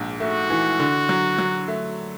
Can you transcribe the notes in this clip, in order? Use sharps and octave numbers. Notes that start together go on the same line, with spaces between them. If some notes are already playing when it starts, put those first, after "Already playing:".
Already playing: A#1 G#2
A3 F#4
E3
D3
F#3
F#3
A3